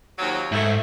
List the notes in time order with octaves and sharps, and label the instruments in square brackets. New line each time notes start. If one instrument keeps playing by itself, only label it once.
[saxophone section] D#2 F3 F#3
[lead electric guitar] G#2 [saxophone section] A3 E4